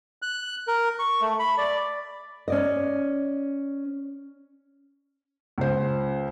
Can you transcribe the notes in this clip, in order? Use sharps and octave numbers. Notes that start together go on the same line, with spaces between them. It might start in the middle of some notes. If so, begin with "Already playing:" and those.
F#6
A#4
C#6
A3
B5
D5
C#4 D5 D#5
C#2 C5